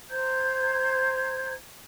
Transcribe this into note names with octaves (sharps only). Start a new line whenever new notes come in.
C5 A#5 G6 G#6